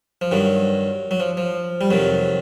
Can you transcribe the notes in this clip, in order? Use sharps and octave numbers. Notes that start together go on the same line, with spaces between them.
F3
G2 D#3 F#3
F#3
F3
F3
G3
F2 C3 D#3 F#3